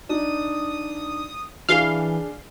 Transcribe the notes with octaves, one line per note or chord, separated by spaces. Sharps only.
D4 D#4 D#6
E3 D4 G#4 F5 G7